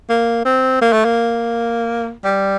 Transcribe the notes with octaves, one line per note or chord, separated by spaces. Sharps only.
A#3
C4
A#3
A3
A#3
G3